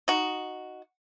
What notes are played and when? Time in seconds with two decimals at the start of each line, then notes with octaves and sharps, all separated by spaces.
0.08 D#4 F#4